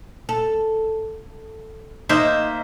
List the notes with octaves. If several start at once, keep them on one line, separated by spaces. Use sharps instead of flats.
A4
A#3 D#4 C5 E5